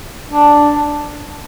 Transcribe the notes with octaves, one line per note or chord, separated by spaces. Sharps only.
D4